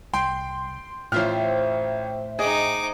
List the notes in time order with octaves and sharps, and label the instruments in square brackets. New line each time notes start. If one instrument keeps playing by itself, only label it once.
[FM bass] C2 [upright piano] G5 [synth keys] C6
[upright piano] A1 F4 F6 [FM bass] A2 [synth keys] C5 E5 G5
[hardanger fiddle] D#4 D6 [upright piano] G#4 D#5